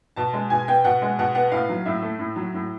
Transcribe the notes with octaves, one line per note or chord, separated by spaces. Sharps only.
B2 A5
G#3
B2 G#5
B3 G5
B2 F#5
G#3
B2 F#5
B3 F#5
A2 F5
F#3
A2 E5
A3
A2
F#3
A2